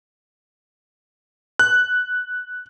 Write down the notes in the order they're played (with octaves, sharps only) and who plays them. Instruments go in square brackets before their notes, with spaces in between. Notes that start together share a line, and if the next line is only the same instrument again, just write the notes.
[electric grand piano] F#6